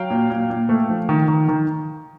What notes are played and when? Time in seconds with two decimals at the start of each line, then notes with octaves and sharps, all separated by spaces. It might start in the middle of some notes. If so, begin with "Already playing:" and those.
Already playing: F#3 F5 G5
0.10 A#2
0.30 A#2
0.50 A#2
0.69 A3
0.89 F3
1.09 D#3
1.28 D#3
1.49 D#3